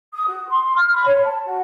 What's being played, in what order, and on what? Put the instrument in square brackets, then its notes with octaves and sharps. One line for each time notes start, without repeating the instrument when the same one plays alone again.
[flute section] D#6
F#4
C6
F6
B5
C#5
A5
F#4